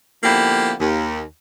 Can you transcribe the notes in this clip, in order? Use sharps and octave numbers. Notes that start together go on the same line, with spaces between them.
D3 F3 A#3 B3 E4 G4
D#2